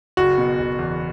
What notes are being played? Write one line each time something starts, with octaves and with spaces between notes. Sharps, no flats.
F#1 F#4
B2
F#1
E2